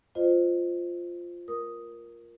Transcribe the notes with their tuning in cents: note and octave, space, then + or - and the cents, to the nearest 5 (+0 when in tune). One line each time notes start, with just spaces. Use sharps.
F4 +0 C5 -10 D#5 -25
A3 +0 A#4 +5 D#6 +0